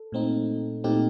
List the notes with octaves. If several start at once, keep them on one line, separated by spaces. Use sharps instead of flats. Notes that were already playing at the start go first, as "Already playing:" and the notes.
Already playing: A4
A#2 A3 C4 D#4
A#2 A3 C4 D#4 G4